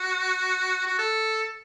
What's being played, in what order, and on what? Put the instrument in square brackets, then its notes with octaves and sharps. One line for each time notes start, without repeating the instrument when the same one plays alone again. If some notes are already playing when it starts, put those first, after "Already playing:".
Already playing: [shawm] F#4
F#4
A4